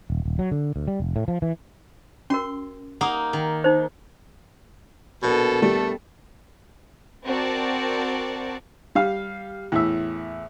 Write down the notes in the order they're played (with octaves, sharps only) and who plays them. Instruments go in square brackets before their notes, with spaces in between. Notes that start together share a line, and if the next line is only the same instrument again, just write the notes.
[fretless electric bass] D#1
D#1
F#3
D3
D2
G3
F1
A2
F3
E3
[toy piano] C#4 F#4 A#4 [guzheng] C6
[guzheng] A#3 D#4 [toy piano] F#5 D#6
[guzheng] D#3
[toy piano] D#4 C5
[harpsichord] A#1 [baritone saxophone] B2 [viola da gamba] B3 A4
[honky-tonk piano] G3 [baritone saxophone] A3
[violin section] C4 F#4 A#4 D5 A5
[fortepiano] G3 F5
E2 A2 E5